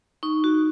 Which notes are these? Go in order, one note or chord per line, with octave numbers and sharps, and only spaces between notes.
D#4 C#6
F#4